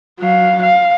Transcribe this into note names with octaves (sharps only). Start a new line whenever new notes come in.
F#3 F5
F5